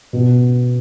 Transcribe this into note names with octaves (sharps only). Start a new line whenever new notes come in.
B2